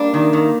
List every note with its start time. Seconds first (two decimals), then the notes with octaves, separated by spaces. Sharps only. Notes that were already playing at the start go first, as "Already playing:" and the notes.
Already playing: G3 A#3 D4
0.14 D#3
0.33 D#3 A#3